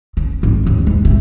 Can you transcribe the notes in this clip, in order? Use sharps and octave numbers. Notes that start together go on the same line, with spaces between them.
C#3
G#1 D#3
D#2
G#2
C3